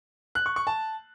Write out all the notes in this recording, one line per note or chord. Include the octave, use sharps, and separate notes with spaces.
F#6
C#6
C#6
A5